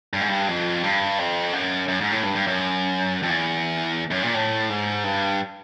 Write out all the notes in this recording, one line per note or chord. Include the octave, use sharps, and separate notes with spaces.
G2
G#2
G2
F2
G2
F2
F#2
F#2
G#2
A2
G2
G2
F#2
F2
E2
F#2
A#2
A2
G#2
G2